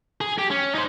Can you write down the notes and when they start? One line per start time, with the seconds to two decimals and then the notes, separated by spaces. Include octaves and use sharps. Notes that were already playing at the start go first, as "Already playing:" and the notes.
0.21 G#4
0.38 G4
0.51 C#4
0.75 D#4 C5